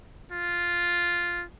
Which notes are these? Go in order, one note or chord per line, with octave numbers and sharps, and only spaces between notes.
F4